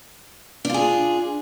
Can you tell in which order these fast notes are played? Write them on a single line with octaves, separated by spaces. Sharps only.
D4 F4 G#4